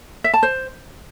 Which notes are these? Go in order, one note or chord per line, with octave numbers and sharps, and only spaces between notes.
E5
A5
C5